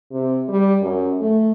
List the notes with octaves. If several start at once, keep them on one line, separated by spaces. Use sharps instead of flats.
C3
G3
F#2
A3